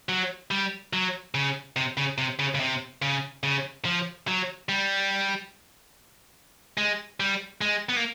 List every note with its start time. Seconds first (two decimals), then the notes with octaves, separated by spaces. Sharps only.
0.09 F#3
0.51 G3
0.93 F#3
1.35 C#3
1.76 C3
1.97 C#3
2.18 C3
2.39 C#3
2.55 C#3
2.60 C3
3.02 C#3
3.43 C#3
3.85 F3
4.28 F#3
4.69 G3
6.78 G#3
7.20 G3
7.61 G#3
7.89 B3
7.96 A#3